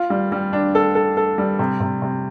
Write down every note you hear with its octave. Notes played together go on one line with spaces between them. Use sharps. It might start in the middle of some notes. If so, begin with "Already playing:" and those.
Already playing: F4
G3
G3
D4
A4
A4
A4
G3
C3
C3
C3